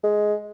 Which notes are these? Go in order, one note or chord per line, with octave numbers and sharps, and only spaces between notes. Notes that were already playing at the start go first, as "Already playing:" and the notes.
G#3